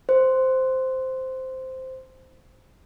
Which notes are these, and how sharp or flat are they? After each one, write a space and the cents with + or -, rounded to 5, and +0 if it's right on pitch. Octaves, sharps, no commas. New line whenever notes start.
C5 -5